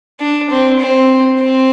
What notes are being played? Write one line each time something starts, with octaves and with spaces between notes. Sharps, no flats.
D4
C4
C4
C4